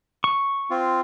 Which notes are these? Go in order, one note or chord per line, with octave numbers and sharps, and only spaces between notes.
C#6
C4 F4